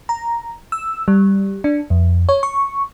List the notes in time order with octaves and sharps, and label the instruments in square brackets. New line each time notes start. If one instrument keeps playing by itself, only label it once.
[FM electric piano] A#5
E6
G3
D4
F2
C#5
C#6